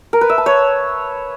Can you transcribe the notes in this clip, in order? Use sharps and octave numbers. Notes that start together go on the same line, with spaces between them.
A#4
B4
E5
A5
C#5